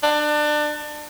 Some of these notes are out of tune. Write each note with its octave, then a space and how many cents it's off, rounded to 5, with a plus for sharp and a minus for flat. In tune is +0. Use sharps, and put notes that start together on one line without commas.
D4 +30